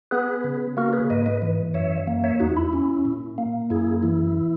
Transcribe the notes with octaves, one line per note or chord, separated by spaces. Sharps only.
B3 G#4 B4
C#3
A#3 F#4 A#4
G#4 B4
G#2 B4 D#5
B4 D#5
E3
F#2 C#5 E5
A#3
C#5 E5
E2 D#4 F#4
E4
C#4
A#2
A#3
F#2 E4 G#4
E3 E4